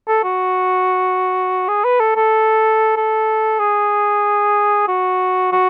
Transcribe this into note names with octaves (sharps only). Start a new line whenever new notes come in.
A4
F#4
G#4
B4
A4
A4
A4
G#4
F#4
F#4